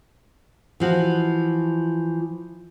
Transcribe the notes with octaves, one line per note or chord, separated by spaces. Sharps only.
E3 F3 F#4